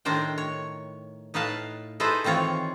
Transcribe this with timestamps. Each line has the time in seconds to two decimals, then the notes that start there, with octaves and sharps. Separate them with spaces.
0.05 A2 D#3 D4 A#4 C5 G5
0.38 C#5
1.34 A2 D#4 B4 F5 A5
2.00 D#4 E4 G#4 A4 B4 C5
2.24 D#3 E3 C4 F4 C#5